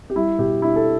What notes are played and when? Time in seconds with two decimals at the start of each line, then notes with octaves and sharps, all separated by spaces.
0.10 G4
0.16 G3 E4
0.39 B2 G4
0.62 D4 E4
0.76 A4